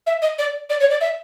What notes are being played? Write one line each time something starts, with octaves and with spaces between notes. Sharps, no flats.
E5
D#5
D5
D5
C#5
D5
E5